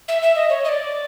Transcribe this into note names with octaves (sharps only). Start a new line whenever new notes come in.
E5
E5
D#5
C#5
D#5
D5